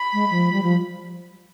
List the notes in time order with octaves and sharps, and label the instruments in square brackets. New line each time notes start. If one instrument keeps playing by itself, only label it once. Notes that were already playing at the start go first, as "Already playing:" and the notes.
Already playing: [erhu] B5
[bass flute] G#3
F3
G3
F3